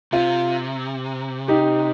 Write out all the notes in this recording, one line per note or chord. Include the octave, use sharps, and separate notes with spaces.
C3 F4
D#4 G4